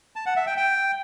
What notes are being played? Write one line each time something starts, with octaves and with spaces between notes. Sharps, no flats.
A5
F#5
E5
G5
G5